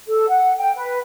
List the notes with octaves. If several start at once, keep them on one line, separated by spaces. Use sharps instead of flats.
A4
F#5
G5
B4